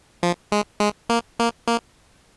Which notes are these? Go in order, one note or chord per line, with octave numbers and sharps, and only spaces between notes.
F3
G#3
G#3
A#3
A#3
A#3